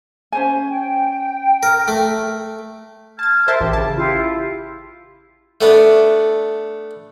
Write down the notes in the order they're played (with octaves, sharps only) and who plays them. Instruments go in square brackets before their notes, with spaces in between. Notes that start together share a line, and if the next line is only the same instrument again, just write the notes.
[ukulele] C#4 C5 G#5
[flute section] G5
[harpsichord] A#4
A3
[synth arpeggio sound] A5 A6 [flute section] F6 G#6
[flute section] A#4 [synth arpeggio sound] C5 E5 A5
[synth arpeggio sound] A1 [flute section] G4
[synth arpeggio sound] C#3 A5
[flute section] E4 F4 G4
[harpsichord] A3 B3 D4